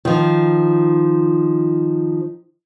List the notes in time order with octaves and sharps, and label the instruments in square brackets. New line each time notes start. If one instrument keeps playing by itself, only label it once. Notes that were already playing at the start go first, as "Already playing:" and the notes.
[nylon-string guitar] D#3 F3